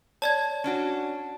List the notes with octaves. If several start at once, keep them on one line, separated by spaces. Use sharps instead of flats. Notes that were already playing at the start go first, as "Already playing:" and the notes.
C#5 D5 A5 G#6
C#4 D4 F#4